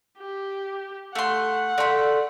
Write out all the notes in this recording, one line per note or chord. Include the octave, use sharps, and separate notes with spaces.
G4
A3 F#5 C6
A3 D5 B5 C6